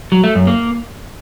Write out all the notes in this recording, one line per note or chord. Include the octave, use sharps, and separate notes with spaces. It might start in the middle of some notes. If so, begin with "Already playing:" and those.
F#3
A3
F#2
A#3